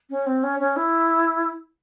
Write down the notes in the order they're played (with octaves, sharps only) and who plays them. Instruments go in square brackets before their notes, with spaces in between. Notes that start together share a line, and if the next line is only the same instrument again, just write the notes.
[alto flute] C#4
C4
C#4
C#4
E4